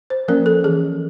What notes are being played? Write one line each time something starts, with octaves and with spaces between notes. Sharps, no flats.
C5
F3 A#3 C#4 A#4
A4
E3 G#4